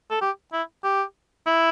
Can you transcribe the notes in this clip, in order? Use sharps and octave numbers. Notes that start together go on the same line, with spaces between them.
A4
G4
E4
G4
E4